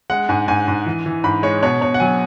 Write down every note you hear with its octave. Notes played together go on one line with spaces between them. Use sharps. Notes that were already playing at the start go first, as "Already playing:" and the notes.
G#3 F#5
G#2 G#5
G#2 G#5
G#2
E3
E3
G#2 B5
G#3 C#5
B2 C#5
B2 C#5
F#5
F#3 G#5